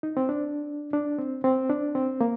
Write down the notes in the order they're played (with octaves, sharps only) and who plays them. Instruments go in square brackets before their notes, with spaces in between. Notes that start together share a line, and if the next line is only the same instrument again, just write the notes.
[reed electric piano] D#4
C4
D4
D4
C4
C4
D4
C4
A#3